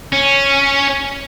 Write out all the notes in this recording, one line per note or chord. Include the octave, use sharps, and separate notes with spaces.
C#4